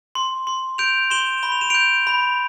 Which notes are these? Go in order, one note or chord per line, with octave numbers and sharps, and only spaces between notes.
C6
C6
G6 D7 F7
C6 E7 G7
B5 G7
F7
E7
G6 D7 F7
B5